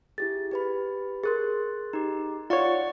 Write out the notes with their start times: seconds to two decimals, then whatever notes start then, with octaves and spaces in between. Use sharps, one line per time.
0.18 E4 G4 G#4 A6
0.51 G4 B4 B5
1.24 G#4 A#4 C6 F#6 A6
1.93 D#4 G4
2.50 F4 C#5 D5 F#5 C#6